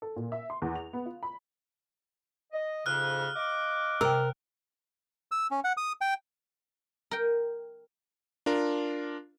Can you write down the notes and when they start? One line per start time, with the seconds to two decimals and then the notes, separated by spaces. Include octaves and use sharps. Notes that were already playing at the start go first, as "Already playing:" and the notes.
0.02 A4
0.16 A#2
0.32 E5
0.50 C6
0.62 E2
0.75 F7
0.93 B3
1.06 F4
1.23 B5
2.52 D#5
2.86 F2 G#2 C#3 F6 F#6
3.34 D#5 F5 D6
4.01 C3 A#4 G5
5.32 E6
5.51 C#4
5.64 F#5
5.77 D#6
6.01 G5
7.11 A#4 G5
8.46 D4 F4 A#4